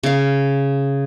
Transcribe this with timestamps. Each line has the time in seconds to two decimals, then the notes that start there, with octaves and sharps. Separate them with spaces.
0.03 C#3 F5